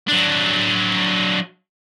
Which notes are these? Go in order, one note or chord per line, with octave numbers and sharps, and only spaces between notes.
F#3 D4